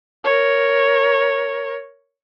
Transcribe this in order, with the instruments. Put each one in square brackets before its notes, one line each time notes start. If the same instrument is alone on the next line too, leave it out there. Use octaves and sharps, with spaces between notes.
[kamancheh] A#4 C#5